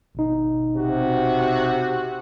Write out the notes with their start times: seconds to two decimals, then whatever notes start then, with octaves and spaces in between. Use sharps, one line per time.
0.15 G#1 B2 D#4
0.75 C3 F#4